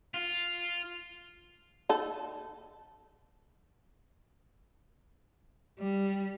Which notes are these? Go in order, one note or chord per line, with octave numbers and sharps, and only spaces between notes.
F4
D#4 A4
G3